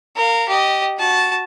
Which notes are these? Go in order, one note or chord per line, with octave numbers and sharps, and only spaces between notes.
A#4 F5
G4 D#5
F#4 A5